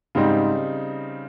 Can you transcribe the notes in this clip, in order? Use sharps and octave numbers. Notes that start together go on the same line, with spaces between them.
G#2 C#3 G3 C4 D#4